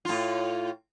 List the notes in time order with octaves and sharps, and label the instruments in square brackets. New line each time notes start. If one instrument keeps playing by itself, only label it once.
[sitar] A2 F4